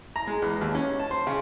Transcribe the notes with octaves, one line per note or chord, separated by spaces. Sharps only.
A#5
G#3
E2
D#2
C#4
A5
C5
C#3